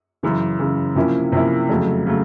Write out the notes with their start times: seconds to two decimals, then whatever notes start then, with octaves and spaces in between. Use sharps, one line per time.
0.23 F#2 C#3 E3
0.60 F#2 C#3 E3
0.96 C3 F3 A#3 C#4 E4
1.32 C3 F3 A#3 C#4 E4
1.69 F2 C#3 F#3 A3
2.07 C#3 F#3 A3